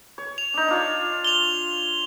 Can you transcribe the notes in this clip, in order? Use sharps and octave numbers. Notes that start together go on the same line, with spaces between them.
C#5
F7
D4 D#4
D4 F4 C#5
F7 G7